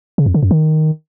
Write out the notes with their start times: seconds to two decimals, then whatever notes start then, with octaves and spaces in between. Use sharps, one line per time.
0.18 C#3
0.26 F2
0.34 D3
0.43 F#2
0.51 D#3